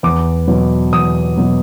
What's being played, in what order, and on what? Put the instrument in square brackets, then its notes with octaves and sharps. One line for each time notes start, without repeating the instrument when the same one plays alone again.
[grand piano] E2 D6
B2 F#3
E2 D#6
B2 F#3